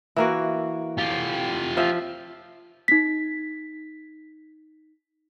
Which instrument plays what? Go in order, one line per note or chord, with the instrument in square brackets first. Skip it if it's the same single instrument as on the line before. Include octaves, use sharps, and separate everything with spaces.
[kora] E3 A#3 F#4
[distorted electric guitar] F4 G4
[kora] F3 E5
[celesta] D#4 B6